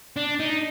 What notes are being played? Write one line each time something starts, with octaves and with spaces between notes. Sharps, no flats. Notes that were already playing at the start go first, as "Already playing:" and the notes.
D4
D#4